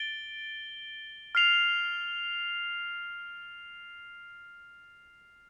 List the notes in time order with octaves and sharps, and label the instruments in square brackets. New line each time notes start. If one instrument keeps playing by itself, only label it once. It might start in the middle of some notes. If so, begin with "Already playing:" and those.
Already playing: [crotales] A6 D7 G7
F6 C7 F7